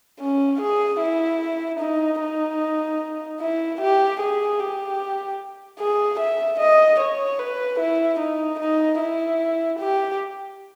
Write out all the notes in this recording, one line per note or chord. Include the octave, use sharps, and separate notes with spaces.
C#4
G#4
E4
D#4
D#4
E4
G4
G#4
G4
G#4
E5
D#5
C#5
B4
E4
D#4
D#4
E4
G4